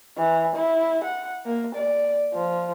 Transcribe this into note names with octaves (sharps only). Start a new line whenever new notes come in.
E3
E4
F#5
A#3
D5
F3